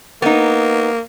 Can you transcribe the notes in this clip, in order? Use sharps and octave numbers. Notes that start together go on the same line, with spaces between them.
A#3 B3 D#4